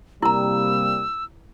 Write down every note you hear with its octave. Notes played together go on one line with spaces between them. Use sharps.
C3 G3 A#3 E4 A#5 E6